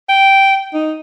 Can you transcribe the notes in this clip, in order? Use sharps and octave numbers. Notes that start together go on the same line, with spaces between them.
G5
D#4